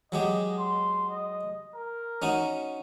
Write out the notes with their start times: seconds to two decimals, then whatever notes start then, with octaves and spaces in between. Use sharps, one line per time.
0.12 F#3 G#3 G4 D#5
0.58 C6
1.10 D#5
1.74 A#4
2.22 C#4 D#4 F#4